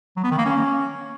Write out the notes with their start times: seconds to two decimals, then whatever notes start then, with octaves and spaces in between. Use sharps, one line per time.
0.16 F#3
0.24 B3
0.31 D#3
0.38 A#3
0.45 C#4